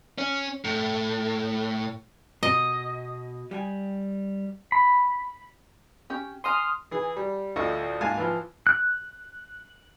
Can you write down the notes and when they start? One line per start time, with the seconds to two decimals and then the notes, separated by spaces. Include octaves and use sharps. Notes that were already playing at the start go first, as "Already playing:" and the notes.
0.18 C#4
0.65 A2
2.43 B2 D#5
3.51 G3 G5 G#5
4.72 B5
6.10 C#4 G4
6.44 G#5 A#5 C6 D#6 F6
6.91 E3 G#4
7.17 G3
7.56 D2 A2 F4 A4 D#5 C#6
8.01 G#2 A#3 F5 G#5 A5
8.17 E3 F3
8.67 F#6